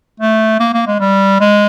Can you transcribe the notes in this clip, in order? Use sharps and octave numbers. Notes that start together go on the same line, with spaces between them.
A3
A#3
A#3
G#3
G3
G#3